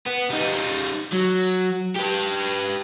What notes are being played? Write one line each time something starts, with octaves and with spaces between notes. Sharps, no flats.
B3
G3 D#4
F#3
G4 B4